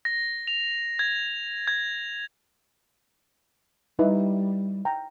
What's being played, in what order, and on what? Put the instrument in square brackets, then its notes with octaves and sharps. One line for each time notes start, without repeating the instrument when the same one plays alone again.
[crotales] A#6
F7
G#6
G#6
[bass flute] G3 [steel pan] D#4 E4 B4
[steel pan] G5 A#5